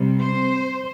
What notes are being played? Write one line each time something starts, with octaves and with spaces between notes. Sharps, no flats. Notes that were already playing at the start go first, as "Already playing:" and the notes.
Already playing: C3 G3
C5